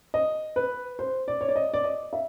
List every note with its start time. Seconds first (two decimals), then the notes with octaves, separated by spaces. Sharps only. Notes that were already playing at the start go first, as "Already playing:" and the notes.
0.14 D#5
0.56 B4
0.99 C5
1.28 D5
1.41 C#5
1.49 D5
1.56 D#5
1.74 D5
1.84 D#5
2.13 E5